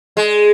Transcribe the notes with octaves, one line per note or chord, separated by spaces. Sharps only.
G#3